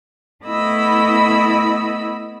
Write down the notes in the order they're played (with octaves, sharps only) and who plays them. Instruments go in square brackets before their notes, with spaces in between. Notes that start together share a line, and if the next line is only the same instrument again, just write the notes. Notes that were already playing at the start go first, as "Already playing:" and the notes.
[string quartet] A3 B3 E4 D#5 B5 E6